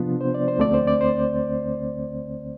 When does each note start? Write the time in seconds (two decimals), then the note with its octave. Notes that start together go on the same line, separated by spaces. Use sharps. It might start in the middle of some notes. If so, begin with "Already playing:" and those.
Already playing: C3 F3 B3 D4 F4
0.21 C5
0.34 D5
0.48 C5
0.58 D2 D3 A3 C4 D5
0.74 C5
0.87 D5
1.01 C5